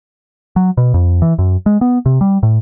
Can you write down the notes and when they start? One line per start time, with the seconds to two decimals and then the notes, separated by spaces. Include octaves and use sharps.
0.56 F#3
0.77 B2
0.94 F2
1.22 E3
1.39 F#2
1.66 G#3
1.81 B3
2.06 C3
2.21 G3
2.43 A2